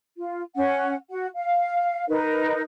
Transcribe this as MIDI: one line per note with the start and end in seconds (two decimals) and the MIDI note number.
0.17 0.42 65
0.56 0.94 61
0.56 0.94 78
1.10 1.26 66
1.10 1.26 78
1.34 2.08 77
2.08 2.62 63
2.08 2.62 70
2.08 2.62 71